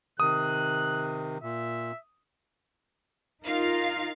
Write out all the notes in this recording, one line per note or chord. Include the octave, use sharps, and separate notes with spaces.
C3 D#3 D#6 F#6
A#2 E5
D#4 F4 A#4 F5